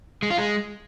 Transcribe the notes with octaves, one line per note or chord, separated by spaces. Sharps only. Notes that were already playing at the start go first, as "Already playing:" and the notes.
G#3
F4
G#3